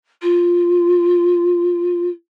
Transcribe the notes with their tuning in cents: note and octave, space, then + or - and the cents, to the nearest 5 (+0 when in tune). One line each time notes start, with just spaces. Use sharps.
F4 +0